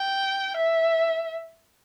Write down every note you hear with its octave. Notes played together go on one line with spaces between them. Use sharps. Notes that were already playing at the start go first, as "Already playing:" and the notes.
Already playing: G5
E5